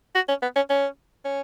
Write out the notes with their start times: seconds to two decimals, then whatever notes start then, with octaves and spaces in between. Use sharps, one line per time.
0.15 F#4
0.28 C#4
0.42 B3
0.56 C#4
0.70 C#4
1.25 C#4